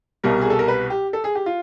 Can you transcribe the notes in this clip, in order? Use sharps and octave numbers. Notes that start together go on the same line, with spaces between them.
C2 B2 G3 A#4
G#4
A4
A#4
B4
G4
A4
G#4
G4
F4